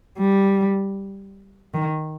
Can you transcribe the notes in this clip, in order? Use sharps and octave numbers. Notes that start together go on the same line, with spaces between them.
G3
D#3